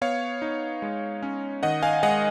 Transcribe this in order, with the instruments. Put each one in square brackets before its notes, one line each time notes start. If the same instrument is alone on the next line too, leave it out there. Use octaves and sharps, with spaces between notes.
[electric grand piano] B3 C#5 F5
D#4
G#3
C#4
D#3 D#5 F#5
F5 G#5
G#3 D#5 F#5